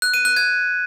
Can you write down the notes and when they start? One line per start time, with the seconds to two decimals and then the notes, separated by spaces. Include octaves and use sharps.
0.02 F#6
0.14 D#7
0.25 F#6
0.36 G#6